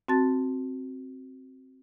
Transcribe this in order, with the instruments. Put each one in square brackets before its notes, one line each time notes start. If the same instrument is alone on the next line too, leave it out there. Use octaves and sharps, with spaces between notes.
[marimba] C4 F#4 A5 A6